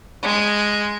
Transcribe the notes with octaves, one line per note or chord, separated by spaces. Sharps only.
G#3